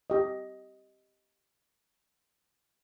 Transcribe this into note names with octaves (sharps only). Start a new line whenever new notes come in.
G4 D#5